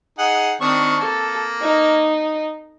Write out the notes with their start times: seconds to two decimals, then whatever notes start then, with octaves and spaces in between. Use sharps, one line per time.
0.19 D#4 G#4 F#5
0.61 D#3 C4 D4 C#6
1.00 A#3 A4
1.62 D#4